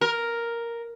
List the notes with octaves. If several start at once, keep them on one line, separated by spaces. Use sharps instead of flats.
A#4